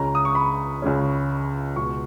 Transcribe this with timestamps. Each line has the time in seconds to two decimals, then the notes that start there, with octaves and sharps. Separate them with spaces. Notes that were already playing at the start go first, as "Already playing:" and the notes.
Already playing: C#2 C#3 G#3 C#4 A#5
0.15 D#6
0.25 C#6
0.35 B5
0.82 C#2 C#3 G#3 C#4
1.76 C#2 B2 G#3 C#6